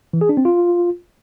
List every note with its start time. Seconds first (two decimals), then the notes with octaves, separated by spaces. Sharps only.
0.13 E3
0.21 G#4
0.29 D4
0.37 C4
0.45 F4